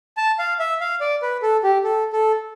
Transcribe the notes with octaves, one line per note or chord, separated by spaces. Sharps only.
A5
F5
E5
F5
D5
B4
A4
G4
A4
A4